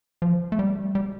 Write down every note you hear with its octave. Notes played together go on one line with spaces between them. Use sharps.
F3
A3
G3
G3